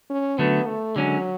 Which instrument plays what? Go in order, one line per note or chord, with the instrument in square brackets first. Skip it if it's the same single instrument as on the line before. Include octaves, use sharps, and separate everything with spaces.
[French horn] C#4
[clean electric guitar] D3 F#3 A3 [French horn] B3
[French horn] A3
[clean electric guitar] D3 G#3 C#4 [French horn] F#3